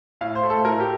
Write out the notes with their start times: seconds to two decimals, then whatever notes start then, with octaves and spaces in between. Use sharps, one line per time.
0.21 A2 F5
0.35 C5
0.43 A3
0.50 A4
0.64 A2 A#4
0.80 G4